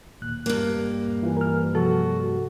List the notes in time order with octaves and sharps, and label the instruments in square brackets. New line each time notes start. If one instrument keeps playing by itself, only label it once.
[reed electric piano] D#2 A#2 F#6
[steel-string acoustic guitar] G2 A#3
[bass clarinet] E3 [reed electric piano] E4 F4
[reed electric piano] A#4 F6
[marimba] C3 F3 [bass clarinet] F#4 [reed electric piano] A4